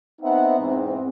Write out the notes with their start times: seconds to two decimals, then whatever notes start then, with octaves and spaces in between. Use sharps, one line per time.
0.22 B3 C4 D#4 E5 F#5
0.59 E2 G#2 C4